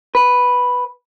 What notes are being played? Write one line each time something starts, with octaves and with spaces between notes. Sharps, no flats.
B4